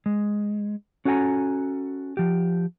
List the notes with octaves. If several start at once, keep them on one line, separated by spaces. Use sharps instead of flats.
G#3
C#4 F#4 A4 F5 G#5 A#5
F3 G4